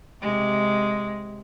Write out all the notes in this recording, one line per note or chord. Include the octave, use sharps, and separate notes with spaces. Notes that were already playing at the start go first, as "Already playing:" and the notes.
C3 G#3